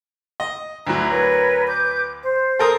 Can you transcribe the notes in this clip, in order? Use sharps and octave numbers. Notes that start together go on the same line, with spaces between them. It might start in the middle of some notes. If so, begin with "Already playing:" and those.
D#5
D2 F#3 E4 A#5 B5
A#4 B4 C#5
B4 D6 G6
C5
A4 A#4 D#6